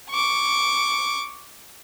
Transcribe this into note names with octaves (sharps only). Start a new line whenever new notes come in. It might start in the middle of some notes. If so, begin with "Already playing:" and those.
C#6 D6